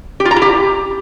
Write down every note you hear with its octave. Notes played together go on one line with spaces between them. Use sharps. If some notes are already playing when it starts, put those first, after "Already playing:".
G4
F4
A#5
E4
G4